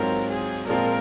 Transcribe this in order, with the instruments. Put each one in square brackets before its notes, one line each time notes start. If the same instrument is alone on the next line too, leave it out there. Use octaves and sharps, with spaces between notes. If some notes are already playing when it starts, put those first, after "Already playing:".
Already playing: [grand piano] G#2 F#3 C4 F4 [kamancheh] A#4
[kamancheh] G#4
[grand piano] A#2 F3 G#3 C4 F4 [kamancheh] A#4